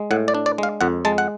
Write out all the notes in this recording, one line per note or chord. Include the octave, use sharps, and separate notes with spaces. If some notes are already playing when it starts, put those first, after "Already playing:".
Already playing: G#3
A2 F#5
D5
D4
D5
G#3 F5
F2 F#5
G#3 A5
F#5